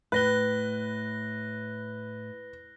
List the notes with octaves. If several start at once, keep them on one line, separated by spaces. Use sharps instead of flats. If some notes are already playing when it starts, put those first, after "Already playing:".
A2 B4 F#6 A#6 G7